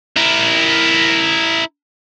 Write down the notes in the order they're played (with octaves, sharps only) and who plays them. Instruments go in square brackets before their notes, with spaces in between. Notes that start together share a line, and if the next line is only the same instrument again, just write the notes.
[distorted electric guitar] E4 A#4